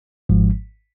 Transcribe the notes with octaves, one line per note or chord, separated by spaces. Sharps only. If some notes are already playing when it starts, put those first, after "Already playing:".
G#1 G#2 F3 G#3